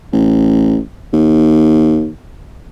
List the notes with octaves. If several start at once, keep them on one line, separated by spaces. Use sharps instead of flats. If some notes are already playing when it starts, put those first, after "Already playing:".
A1
D#2